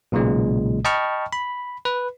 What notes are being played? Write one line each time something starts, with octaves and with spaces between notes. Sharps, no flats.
B1 A#2 C#3 G#3
D#5 G5 A5 B5 C#6 F6
B5
B4